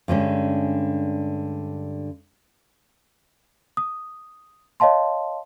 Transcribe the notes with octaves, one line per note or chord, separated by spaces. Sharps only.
G2 D3 G#3 C#4
D#6
C#5 D#5 F5 A5 C6